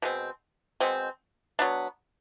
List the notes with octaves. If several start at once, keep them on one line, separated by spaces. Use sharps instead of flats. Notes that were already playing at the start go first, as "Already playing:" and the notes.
B2 G#3 C4
B2 G#3 C4
F#3 B3 D4